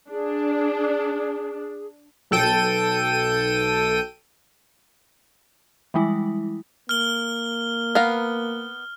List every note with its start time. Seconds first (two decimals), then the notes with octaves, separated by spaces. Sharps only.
0.10 D4 G#4
2.31 B1 A4 G5 D#7
5.94 E3 G3 G#3 E4
6.89 A#3 F6 G7
7.95 B3 A#4 F5